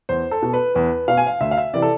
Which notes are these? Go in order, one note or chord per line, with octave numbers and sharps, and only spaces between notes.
E2 C5
A4
B2
B4
E2 B4
B2 F5
G#5
F5
D2 E5
F5
E5
C3 E3 D5
A4